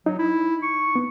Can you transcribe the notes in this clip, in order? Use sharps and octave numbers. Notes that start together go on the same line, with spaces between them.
F#3 D#4
E4
C#6
B3